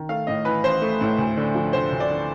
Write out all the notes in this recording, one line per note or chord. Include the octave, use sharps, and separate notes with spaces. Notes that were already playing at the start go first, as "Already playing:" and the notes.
Already playing: D#3
A3 F5
A2 D#5
E3 B4
A1 C5
A3
A2
D2
D3
F3
D2 C5
D2
D5
D3